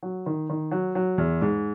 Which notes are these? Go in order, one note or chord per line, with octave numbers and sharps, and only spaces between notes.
F#3
D#3
D#3
F#3
F#3
E2
G#2